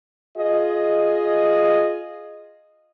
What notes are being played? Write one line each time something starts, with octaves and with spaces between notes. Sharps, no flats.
F4 G#4 D#5